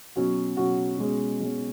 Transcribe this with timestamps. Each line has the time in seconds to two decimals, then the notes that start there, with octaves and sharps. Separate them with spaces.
0.16 B2 F#3 C#4 F#4
0.57 B2 F#3 C#4 F#4
0.98 B2 G#3 C#4
1.40 B2 G#3 C#4